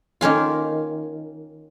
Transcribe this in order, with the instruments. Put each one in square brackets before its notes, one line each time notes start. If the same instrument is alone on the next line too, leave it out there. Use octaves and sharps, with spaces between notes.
[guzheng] D#3 A#3 C#4 F4